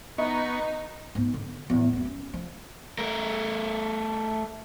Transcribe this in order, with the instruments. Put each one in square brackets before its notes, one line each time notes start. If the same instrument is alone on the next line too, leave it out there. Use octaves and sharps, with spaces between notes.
[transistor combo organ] B3 C#6 [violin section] D#4 [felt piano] D#5
[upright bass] G#2 B3
D3
E2 A2
F#2 A#3
C#4
F3
[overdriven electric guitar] A3 A#4